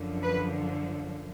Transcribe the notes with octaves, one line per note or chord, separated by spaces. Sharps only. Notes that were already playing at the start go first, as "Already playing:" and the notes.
Already playing: F#2 D3 F3
B4